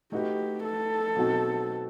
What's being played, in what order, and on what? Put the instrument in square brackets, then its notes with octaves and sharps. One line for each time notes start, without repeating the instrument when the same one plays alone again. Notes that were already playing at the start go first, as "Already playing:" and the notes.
[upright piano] A3 D#4 F#4 B4 [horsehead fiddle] G4
[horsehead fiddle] A4
[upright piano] B2 F#3 C4 D#4 F#4